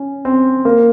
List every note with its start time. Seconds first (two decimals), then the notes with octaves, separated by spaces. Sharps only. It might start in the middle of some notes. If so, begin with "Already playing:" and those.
Already playing: C#4
0.25 C4
0.65 A#3